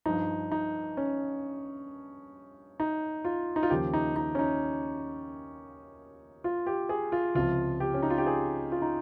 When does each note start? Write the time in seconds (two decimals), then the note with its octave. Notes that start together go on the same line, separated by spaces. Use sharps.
0.06 G2 F3 D#4
0.52 D#4
0.97 C#4
2.80 D#4
3.25 F4
3.56 D#4
3.63 F4
3.70 D#2 C#3 F3 G4
3.94 D#4
4.16 D#4
4.35 C#4
4.39 D#4
6.44 F4
6.66 G4
6.89 G#4
7.12 F4
7.35 C#2 C3 F3 F4
7.80 G4
7.94 C#4
8.03 D#4
8.10 F4
8.18 G4
8.27 G#4
8.72 F4
8.82 D#4